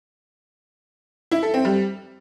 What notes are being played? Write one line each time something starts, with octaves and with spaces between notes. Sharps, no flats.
E4
A4
C4
G3